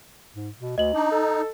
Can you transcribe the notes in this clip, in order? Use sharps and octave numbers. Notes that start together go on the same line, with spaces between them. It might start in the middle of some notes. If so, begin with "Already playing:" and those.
G#2
B2
D2 D#5 F#7
D4 D#4
A4